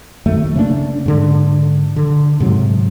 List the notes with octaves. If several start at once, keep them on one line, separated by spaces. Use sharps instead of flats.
F#2 D#3 A3
C#3 A#3 D4
G#2 D3
D3
G#2 C3 F#3